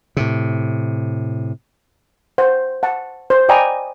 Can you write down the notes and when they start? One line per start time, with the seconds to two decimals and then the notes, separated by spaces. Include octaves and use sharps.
0.17 A2 C3
2.38 C5 F#5
2.83 F#5 A5
3.30 C5
3.49 D5 D#5 G5 G#5 A#5 B5